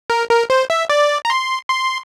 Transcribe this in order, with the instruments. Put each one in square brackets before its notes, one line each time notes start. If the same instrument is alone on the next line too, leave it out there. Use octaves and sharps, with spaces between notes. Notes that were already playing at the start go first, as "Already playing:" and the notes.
[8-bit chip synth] A#4
A#4
C5
E5
D5
A#5
C6
C6